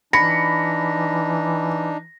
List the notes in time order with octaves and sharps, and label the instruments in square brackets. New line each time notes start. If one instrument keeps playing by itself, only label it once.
[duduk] E3 [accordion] D4 D#4 [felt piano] B5 C#7 [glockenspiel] A#6